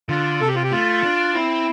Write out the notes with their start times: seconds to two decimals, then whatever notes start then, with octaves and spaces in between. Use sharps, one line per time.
0.09 D3 F4
0.40 C3 A4
0.48 G4
0.55 F4
0.63 G4
0.72 A3 F4
1.03 D4
1.34 C4 E4